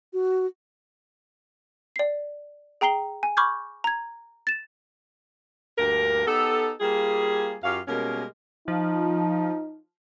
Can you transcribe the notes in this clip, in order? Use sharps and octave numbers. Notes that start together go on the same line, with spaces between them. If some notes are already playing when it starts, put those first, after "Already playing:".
F#4
D5 C7
G#4 G5 A#5 C7 G7
G#5
B5 C#6 D6 F6 G6 G#6
A#5 G#6
A6 E7
D2 G2 A#3 A#4
B3 D#4 G4 A4
G3 A#3 F4 G#4
F#2 F4 G4 C#5 F5
B2 G3 G#3 A#3 C#4 A#4
F3 D#4